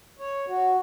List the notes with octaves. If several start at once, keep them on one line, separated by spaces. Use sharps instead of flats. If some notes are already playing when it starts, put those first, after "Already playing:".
C#5
F#4